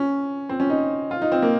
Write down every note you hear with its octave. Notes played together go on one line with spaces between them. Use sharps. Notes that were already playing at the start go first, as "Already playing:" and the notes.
Already playing: C#4
C4
C#4
D#4
F4
D#4
C4
A#3